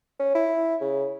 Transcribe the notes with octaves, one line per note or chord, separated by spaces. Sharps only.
C#4
E4
C#3